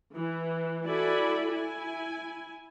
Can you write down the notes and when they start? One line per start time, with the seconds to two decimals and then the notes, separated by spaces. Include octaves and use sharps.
0.16 E3
0.86 E4 F#4 A4 D5 G#5 B5
1.53 E4 G#5